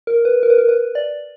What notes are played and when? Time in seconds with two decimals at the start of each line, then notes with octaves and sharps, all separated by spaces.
0.07 A#4
0.25 B4
0.43 A#4
0.50 B4
0.58 A#4
0.69 B4
0.95 D5